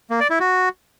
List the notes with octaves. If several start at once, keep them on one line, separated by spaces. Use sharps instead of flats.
A#3
D5
E4
F#4